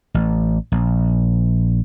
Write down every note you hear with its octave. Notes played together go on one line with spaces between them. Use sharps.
A1
A#1